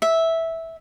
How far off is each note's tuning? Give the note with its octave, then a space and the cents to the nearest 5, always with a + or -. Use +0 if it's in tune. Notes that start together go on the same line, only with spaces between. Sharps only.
E5 -10